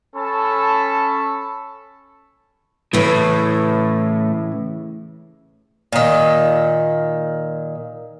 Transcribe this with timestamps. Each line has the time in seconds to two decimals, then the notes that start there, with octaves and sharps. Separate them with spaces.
0.16 C#4 A4 A5 B5 C#6
2.93 A2 C#3 E3
5.92 A#2 D#3